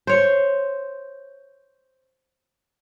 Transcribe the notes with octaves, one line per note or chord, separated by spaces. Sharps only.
C5 C#5